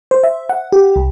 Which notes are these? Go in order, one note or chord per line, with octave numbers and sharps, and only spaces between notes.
C5
E5
F#5
G4
C2